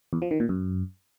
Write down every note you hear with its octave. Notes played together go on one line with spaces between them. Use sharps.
E2
F3
D#3
A#2
F#2